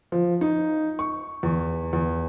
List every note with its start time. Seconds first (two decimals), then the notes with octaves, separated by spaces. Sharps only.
0.12 F3
0.41 D#4
0.99 C#6
1.43 E2
1.93 E2